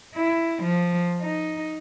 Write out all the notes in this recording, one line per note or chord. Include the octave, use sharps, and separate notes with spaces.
E4
F3
D#4